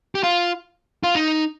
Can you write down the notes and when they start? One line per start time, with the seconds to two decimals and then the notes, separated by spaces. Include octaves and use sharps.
0.15 G4
0.23 F4
1.03 F4
1.15 D#4